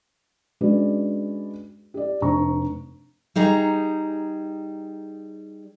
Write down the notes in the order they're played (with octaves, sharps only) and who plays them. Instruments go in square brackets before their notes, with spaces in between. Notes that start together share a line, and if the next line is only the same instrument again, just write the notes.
[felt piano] G#3 C#4 D4 F#4 B4 D5
G4 D5
F1 D4 C5 A#5 C#6
[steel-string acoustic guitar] G3 D#4 G#4 A#5